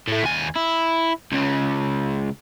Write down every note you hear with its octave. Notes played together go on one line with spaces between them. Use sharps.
A2 A3
D#2 G#5
E4
C#2 C#3